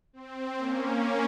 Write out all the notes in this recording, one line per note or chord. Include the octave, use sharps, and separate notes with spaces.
C4
A#3 C#4